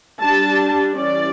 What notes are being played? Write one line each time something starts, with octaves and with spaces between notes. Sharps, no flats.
G3 D4 A5
E3 G3 C#4 D5